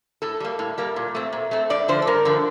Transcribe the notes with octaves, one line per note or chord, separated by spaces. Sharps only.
A2 A4
G3 A#3
A2
G3 A#3
A#2
A3 C4
A#2
A3 C4
G2 D5
D3 F3 C5
A4
G2 A#4
D3 F3